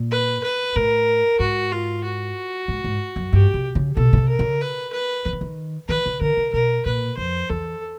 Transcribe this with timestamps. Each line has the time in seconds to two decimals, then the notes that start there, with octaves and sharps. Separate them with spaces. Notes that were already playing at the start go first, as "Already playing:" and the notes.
Already playing: A#2
0.11 B4
0.43 B4
0.76 A2 A#4
1.39 G#2 F#4
1.72 F4
2.04 F#4
2.68 G#2
2.84 G#2
3.16 F#2
3.32 G2 G4
3.54 C3
3.75 C#3
3.96 B2 A4
4.13 B2
4.18 C3
4.29 A#4
4.39 C#3
4.61 B4
4.93 B4
5.25 D#3
5.33 D3
5.41 D#3
5.88 D#3 B4
6.06 C#3
6.21 D3 A#4
6.37 C#3
6.53 B2 A#4
6.86 A#2 B4
7.17 F2 C5
7.49 E2 A4